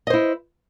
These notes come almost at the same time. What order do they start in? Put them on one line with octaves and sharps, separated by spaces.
D#5 C5 E4